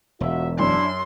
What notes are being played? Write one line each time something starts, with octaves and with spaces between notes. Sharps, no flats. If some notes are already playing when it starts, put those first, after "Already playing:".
E1 F4 F#4 E5
F#2 D4 E4 C6